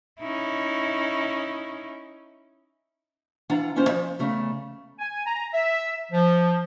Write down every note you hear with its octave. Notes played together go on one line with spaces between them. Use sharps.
C#4 D#4 E4
E3 D4 F4 F#5 A#5
D#2 C#4 F4 C5
F3
E2 C#3 A3
G#5
A#5
E5
F3